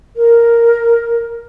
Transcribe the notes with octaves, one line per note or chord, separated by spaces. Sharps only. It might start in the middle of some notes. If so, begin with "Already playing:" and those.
A#4